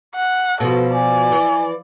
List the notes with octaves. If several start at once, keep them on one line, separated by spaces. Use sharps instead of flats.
F#5
B2 F3 A4
D5 G#5
E3